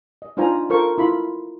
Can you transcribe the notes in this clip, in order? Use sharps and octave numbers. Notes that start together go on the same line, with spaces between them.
D#5
D4 D#4 F4 C5 G#5 A#5
F4 A4 A#4 C5 C#6
E4 F4 B5 C6